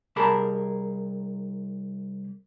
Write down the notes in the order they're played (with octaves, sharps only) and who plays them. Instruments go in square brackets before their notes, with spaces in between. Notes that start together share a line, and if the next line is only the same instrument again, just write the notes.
[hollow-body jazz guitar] C2 G4 G#4 A#4 A5 B5